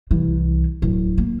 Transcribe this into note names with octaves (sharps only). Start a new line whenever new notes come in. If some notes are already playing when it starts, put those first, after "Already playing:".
C2 E3
D1
A#3